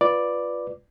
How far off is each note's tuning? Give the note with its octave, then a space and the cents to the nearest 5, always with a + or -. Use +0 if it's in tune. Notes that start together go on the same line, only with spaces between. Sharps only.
F4 +0 B4 +0 D5 +0